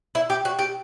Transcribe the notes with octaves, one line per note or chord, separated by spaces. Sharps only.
E4
G4
F#4
G4